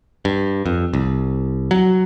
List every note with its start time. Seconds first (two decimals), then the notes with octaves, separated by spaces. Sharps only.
0.25 G2
0.66 F2
0.93 C2
1.71 F#3